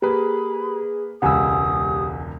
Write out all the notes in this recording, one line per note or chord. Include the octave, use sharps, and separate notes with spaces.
A#3 G4 G#4 B4 B5
E1 C#2 C#3 G4 F#5 G#5 D#6 E6